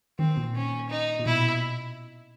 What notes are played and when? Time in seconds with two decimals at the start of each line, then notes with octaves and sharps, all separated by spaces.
0.19 D#3 C4
0.37 A#2
0.54 C#4
0.90 D#4
1.19 A#2
1.25 B2 E4